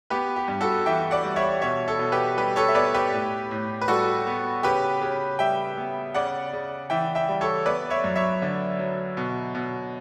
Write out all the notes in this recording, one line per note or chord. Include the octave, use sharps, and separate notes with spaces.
B3 G4 B4
G4
G2
F#4 A4
E3 E5 G5
D5 F#5
G3
C#5 E5
B2 C#5 E5
A4 C#5
B2
G4 B4
G3 G4 B4
A4 C#5
E5
B3 B4 D5
G4 B4
A2
A2
B4
G3 F#4 A4
B3
C#3 G4 B4
C#3
G3 E5 G5
B3
C#3 D5 F#5
C#3
E3 E5 G5
E5 G5
G3
A4 C#5
B3 B4 D5
C#5 E5
F#2
C#5 E5
D3
F#3
B2
B2